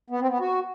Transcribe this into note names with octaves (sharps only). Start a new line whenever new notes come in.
B3
C4
B3
F#4